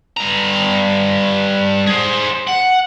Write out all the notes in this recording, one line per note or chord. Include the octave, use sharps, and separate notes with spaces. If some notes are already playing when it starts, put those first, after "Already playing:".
G2 A#5
G#4 C5
F#5